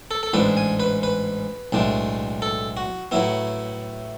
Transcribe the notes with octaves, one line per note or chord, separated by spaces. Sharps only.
A4
A4
A1 G#2 G#3 D4 B4
G#5
B4
B4
B1 A2 G#3 D4
A4
F#4
A2 F#3 B3 E4